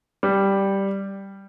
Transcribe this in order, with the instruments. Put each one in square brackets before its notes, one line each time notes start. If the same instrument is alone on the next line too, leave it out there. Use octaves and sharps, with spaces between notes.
[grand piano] G3